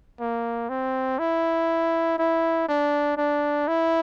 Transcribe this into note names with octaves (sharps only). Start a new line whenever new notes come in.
A#3
C4
E4
E4
D4
D4
E4